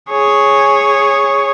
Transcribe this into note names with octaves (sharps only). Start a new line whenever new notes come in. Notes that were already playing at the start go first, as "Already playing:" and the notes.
G#4 C#5